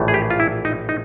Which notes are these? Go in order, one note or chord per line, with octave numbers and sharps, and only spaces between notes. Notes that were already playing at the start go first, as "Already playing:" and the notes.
Already playing: A#1 A2 E3 A3
G#4
G4
F4
E4
D#4
D#4